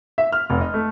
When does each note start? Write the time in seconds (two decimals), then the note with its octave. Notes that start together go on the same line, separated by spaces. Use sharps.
0.18 E5
0.32 F6
0.50 F1
0.61 D#5
0.74 A3